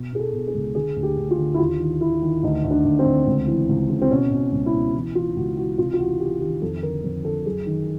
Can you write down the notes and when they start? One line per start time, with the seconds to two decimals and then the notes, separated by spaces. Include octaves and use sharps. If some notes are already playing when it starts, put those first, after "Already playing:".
Already playing: B2
0.13 B2 G#4
0.19 A4
0.33 B2
0.48 G#4
0.55 C#2
0.75 D3 G#4
0.96 D2
1.03 G4
1.17 D2
1.31 F4
1.38 D3
1.54 E4
1.59 D#2 F4
1.80 D#3
2.01 D#3 E4
2.22 D#3
2.43 D2 D#4
2.64 D2
2.71 D4
2.85 D2
2.99 C4
3.06 D2
3.26 C#2
3.47 E3
3.69 C#2
3.90 C#3
4.02 C4
4.10 B2 C#4
4.31 B2
4.52 C#2
4.66 E4
4.74 B2
4.94 E3
5.15 E3 F4
5.36 C#2 F#4
5.57 E3 F#4
5.78 C3 F4
5.93 F4
5.99 E2 F#4
6.20 E2 G4
6.41 D#3 G4
6.62 F2 A4
6.83 D3 A#4
7.04 F2
7.24 D3 A4
7.46 F#2 G#4
7.66 D#3